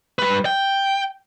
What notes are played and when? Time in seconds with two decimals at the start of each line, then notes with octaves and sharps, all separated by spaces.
0.19 G3 B4
0.45 G5